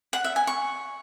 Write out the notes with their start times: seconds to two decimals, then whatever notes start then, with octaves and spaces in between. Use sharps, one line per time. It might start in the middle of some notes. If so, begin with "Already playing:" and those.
0.13 F#5
0.24 E5
0.36 G#5
0.47 C#6